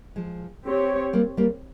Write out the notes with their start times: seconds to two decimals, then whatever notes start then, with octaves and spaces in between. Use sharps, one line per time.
0.16 F3 G#3
0.64 C4 G4 C#5
1.13 G3 A#3
1.37 G3 A#3